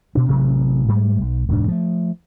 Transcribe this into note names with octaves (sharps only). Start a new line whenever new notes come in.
B2 D4
A1 C3 F#3
G#2 G3 A3
B1
E1 D2 G#2 D4
F3 A3